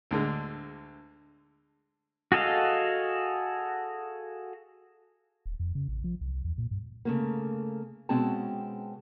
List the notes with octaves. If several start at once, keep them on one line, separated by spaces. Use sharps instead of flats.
D2 D3 G#3
F#4 G#4 A4 D#5 F5
D#1
F2
C#3
A1
F3
C2
E2
A#2
G2
C#3 A3 A#3
B2 G#3 C4 C#4 G5 A5